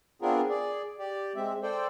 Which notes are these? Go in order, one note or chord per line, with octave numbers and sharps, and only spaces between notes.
B3 C4 D4 F4 G#4 A#4
G#4 D5
G4 D5
G#3 C4 E5
A4 C5 D5 G5